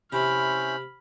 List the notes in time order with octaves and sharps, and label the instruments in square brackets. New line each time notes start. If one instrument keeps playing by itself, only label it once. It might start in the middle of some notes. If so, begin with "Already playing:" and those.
[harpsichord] C3 [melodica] C#4 E4 C5 [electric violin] B5 F6